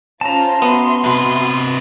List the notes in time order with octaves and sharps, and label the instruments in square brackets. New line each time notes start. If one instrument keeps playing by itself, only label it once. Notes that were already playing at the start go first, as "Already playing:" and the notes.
[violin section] C#4 F4 C5 [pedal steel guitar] A5 A#5
[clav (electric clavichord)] B3 [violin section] F#4 E5 C6
[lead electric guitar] C3 B4